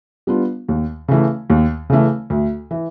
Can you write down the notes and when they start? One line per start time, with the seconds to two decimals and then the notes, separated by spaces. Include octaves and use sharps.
0.27 G3 B3 D4 F4
0.69 D#2
1.08 C#3 E3 A3
1.50 D#2
1.90 C#3 E3 A3
2.30 D2
2.71 E3